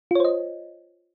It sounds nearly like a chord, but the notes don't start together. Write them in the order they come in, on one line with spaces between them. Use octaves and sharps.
F4 C#5 C5 D#5